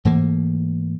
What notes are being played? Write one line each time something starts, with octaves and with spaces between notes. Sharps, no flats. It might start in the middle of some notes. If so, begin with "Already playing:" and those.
G#2 E3 A3 A#3